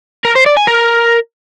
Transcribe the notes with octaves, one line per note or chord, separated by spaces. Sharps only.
A#4
C5
D5
G#5
A#4